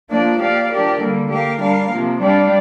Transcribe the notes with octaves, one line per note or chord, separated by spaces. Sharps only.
F3 A#3 D4 F4 D5
A#3 G4 D5 F5
F3 D4 G4 A#4 D5
D3 G3 A#3
A#3 G4 A#4 F5
G3 D4 A#4 F5
C3 F3 A#3
G3 D4 G4 D5 F5